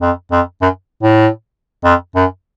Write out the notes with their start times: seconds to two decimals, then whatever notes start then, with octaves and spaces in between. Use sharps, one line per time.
0.01 F2
0.31 F2
0.61 F#2
1.03 A2
1.84 F2
2.15 F#2